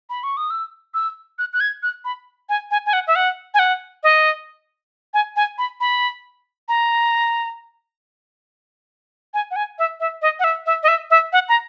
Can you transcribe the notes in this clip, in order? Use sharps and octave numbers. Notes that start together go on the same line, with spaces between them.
B5
C#6
D#6
E6
E6
F#6
F#6
G#6
F#6
B5
G#5
G#5
G#5
F#5
E5
F#5
G#5
F#5
D#5
G#5
G#5
B5
B5
A#5
G#5
F#5
G#5
E5
E5
D#5
F#5
E5
E5
D#5
E5
E5
F#5
A#5